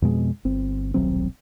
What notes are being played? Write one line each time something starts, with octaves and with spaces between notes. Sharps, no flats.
F2 B2 G#3
G1 C4
D#1 B1 F#3 C4